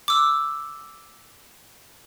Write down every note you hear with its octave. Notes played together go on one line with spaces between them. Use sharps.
D6 E6